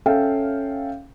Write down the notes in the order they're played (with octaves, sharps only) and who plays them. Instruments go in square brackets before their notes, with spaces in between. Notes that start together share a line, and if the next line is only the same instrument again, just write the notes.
[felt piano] C#4 A4 C#5 E5 F5 G5